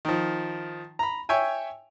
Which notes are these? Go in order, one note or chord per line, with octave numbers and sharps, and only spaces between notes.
D#3 F3
A#5 B5
C#5 E5 G5 G#5